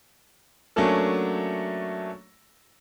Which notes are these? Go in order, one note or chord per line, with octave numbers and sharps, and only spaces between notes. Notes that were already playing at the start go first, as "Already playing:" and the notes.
F#3 A3 A#3 C#4 D4 A4